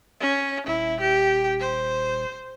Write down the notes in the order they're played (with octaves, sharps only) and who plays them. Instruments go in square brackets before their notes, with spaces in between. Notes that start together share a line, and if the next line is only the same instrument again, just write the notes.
[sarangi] C#4
[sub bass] D#1 [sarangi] E4
[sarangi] G4
C5